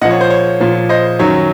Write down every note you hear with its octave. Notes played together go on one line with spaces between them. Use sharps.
A#2 F3 D#5 F#5
C#5
C5
C#5
A#2 F3
C5 D#5
F#2 D#3 F#3 C#5